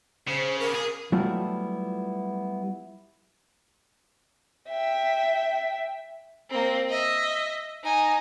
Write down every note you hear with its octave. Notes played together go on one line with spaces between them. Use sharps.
C#3 C5
A#4
G#4
F#3 G3 A3 B3 E4 F4
E5 G5
A#3 C4
D#5 E5
D#4 G#5